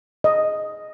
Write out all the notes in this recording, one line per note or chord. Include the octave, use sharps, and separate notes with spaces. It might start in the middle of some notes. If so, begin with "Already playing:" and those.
D#5